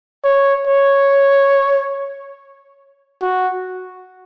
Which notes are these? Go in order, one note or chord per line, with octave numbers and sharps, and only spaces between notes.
C#5
C#5
F#4